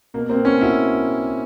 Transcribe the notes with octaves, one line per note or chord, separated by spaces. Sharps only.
B2 A#3
A#3 C4
B2
B3 C#4
B2
E4 F#4